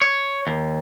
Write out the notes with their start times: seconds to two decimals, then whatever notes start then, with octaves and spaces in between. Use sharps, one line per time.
0.02 C#5
0.47 D#2